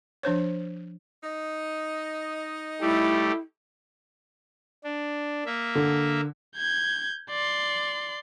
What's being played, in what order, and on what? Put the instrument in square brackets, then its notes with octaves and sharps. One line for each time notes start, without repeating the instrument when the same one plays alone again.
[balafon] F3 D4 C5 C#5
[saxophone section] D#4 D#5
[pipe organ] G3 A3 G4 [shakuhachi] E4
[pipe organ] D4
A#3 E5
[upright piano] D3
[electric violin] G6 G#6
D5 C6